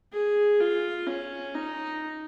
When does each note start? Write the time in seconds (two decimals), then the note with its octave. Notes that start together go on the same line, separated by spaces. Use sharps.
0.13 G#4
0.60 F4
1.07 C#4
1.55 D#4